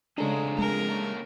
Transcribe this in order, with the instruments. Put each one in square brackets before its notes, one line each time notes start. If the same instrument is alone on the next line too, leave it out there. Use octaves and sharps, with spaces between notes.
[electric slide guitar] F2 G#4 A#5 [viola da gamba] C#3 G#3 [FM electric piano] D4 A4
[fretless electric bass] G#3 [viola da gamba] A#4
[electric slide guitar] A3 A#3 C#4